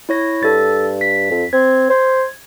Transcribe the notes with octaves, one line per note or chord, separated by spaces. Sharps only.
E4 C#5 A#6
G2 A4 A6
B6
F2
C4 G#6
C5